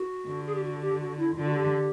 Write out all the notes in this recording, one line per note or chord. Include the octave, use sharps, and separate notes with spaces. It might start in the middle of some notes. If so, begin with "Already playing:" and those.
Already playing: F#4
D3
G#4
G4
F#4
G4
F#4
E4
D3 F4
F#4
G4